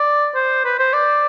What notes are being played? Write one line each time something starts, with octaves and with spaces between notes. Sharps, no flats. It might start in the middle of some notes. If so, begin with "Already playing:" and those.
Already playing: D5
C5
B4
C5
D5